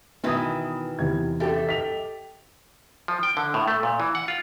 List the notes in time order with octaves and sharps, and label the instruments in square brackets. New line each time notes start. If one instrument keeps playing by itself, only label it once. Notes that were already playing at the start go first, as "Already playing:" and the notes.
[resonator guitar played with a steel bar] B2 D#3 E3 [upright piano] B3 D#6
[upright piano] E2 C3 G#6
[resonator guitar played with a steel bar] F#2 A3 [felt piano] G4 A4
[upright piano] D#5 B6 F7
[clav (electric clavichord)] F3
G5
D3
A2
A3
A#2
E3
F#5
F4